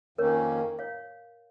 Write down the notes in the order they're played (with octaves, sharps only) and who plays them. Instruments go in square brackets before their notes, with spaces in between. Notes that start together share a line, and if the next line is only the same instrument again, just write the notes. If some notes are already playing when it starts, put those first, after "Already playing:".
[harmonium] F2 D#3 A#3 C#4 [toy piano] A#4 C#5
[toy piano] C#5 F5